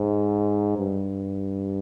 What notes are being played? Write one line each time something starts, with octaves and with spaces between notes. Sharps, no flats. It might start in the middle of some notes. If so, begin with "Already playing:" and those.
Already playing: G#2
G2